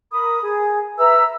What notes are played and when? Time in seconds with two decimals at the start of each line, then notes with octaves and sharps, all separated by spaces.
0.11 A#4 B5 D#6
0.42 G#4
0.98 B4 E5 A#5 E6